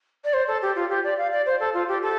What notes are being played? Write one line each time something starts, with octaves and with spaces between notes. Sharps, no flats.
D5
C5
A4
G4
F4
G4
D5
F5
D5
C5
A4
F4
G4
A4